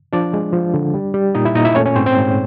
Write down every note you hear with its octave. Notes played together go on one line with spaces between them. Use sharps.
F3 D4 D5
G#3
F3
D3
G3
G3
A#2 D#4 D#5
E4 E5
A#2 D#4 D#5
E4 E5
A3 C#4 C#5
C#4 C#5
G#2 C4 C5
C4 C5
G#2